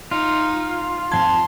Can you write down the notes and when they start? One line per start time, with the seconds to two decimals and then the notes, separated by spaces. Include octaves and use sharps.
0.11 D#4 F4
1.12 F2 A5 C6 G#6